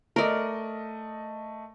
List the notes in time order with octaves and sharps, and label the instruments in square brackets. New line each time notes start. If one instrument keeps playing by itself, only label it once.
[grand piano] A3 D#5 [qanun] A#4 D5